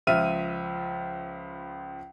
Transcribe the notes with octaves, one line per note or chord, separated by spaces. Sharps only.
C#2 F3 E5 F6 D#7